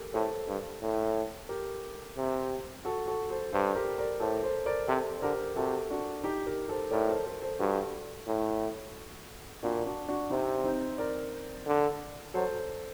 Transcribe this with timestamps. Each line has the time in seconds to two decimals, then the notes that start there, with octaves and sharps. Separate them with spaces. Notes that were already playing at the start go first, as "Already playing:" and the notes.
Already playing: G4 A4 A#4
0.14 A2 A4 C5
0.47 G2
0.81 A2
1.49 G4 A#4
2.17 C3
2.85 F#4 A4
3.07 F#4 A4
3.30 A4 C5
3.52 G2 A4 C5
3.75 G4 A#4
3.98 A#4 D5
4.20 A2 A4 C5
4.43 A4 C5
4.66 A#4 D5
4.88 C3 A4 C5
5.17 C5
5.22 D3 G4 A#4
5.56 C3 F#4 A4
5.90 D4 F#4
6.24 D#4 G4
6.47 G4 A#4
6.69 A4 C5
6.91 A2 A#4 D5
7.09 A4 C5
7.25 A4 C5
7.42 A4 C5
7.59 G2 F#4 A4
8.27 A2
9.63 A#2 D4 F#4
9.85 D4 F#4
10.08 D4 F#4
10.30 C3 C4 D#4
10.64 C4 D#4
10.98 A#4 D5
11.67 D3
12.34 F#3 A4 C5